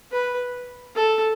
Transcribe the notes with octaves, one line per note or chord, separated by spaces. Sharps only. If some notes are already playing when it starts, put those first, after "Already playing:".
B4
A4